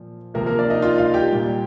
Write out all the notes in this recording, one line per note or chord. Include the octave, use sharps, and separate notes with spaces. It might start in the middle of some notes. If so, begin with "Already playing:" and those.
Already playing: A#2 F3
C3 F3 A#3 A#4
A#3 A#4
D4 D5
D#4 D#5
F4 F5
F4 F5
G4 G5
A#2 G3